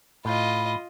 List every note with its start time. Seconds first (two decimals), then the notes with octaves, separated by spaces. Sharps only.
0.25 A2 F4 D#5 B5